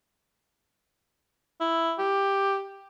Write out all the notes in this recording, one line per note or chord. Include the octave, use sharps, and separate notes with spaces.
E4
G4